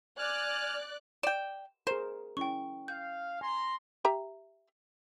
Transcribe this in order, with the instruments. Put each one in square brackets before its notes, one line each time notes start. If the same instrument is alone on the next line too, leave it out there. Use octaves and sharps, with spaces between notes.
[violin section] D5 F#6 [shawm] G#5 [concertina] F6
[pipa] D5 G5 [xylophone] E7
[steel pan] G#4 A#4 [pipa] C5
[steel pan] C#4 E4 [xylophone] G5 C#6
[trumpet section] F5 [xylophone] G6
[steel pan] G#5 [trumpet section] A#5 C6
[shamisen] G4 E5 A#5